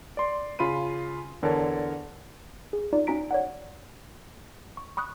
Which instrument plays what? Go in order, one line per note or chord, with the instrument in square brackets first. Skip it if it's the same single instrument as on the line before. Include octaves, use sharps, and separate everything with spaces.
[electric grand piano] D5 C6
C#3 F4 B5 C6 D#7
E2 D3 A#4 C#5 A5
[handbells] G#4
D#4 F4 D5
C#4 D#4 F#4 A#5 B6 D7
C#5 D5 F#5
C#6
B5 C#6 D#6 F#6